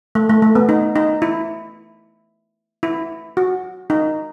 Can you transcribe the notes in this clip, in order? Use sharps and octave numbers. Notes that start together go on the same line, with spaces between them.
A3
A3
A3
B3
D#4
D#4
E4
E4
F#4
D#4